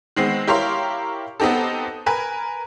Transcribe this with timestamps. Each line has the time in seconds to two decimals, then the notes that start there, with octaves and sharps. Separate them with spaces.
0.16 D#3 G#3 B3 C4
0.47 E4 G4 A#4 C#5 F5 C6
1.40 B3 C4 D#4 G4 A4
2.06 A#4 B4 G#5